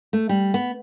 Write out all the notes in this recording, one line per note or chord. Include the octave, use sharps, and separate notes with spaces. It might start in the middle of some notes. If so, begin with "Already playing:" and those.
A3
G3
B3